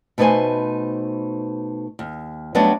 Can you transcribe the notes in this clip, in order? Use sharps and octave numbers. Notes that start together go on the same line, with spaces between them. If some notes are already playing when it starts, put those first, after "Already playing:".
B2 A3 D#4 B4 C5 G#5
D#2
F#3 G3 A3 B3 D4 D#4